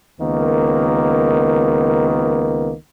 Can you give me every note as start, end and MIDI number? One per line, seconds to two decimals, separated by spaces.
0.20 2.73 37
0.20 2.73 51
0.20 2.73 58
0.20 2.73 59